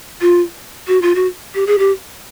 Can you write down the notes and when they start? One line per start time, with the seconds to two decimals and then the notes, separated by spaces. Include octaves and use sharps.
0.21 F4
0.88 F#4
1.02 F4
1.15 F#4
1.55 G4
1.67 G#4
1.79 G4